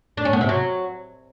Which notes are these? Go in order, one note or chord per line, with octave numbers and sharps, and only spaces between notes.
D4
C#4
B3
C3
F#3